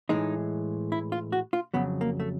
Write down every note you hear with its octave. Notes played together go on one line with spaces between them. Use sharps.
A2 E3 G#3 D#4
E4
F4
F#4
F4
F2 C#3 F#3 B3
A#3
A3